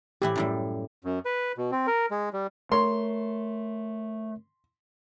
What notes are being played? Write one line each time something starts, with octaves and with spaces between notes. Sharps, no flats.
A2 E3 E4 G4
F#2 A2 G3
F#2
B4
B2
C4
A#4
G#3
G3
A3 A#4 C#5 C6